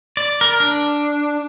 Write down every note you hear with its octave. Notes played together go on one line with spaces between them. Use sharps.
D5
A#4
D4